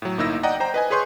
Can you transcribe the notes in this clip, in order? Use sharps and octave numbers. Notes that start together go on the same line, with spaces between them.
A2 F#3
G1 A#3 D#4 E4 E6 A#6
D5 D#5 F#5 G5 A#5 D#6
C5 G5 A#5
B4 D#5 G#5
G#4 B4 C#5 C6 C#6 G6